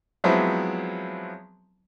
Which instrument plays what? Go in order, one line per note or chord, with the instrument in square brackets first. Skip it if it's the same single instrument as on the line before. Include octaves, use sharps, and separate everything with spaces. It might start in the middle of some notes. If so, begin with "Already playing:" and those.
[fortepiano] F3 F#3 G#3 B3 C4 E4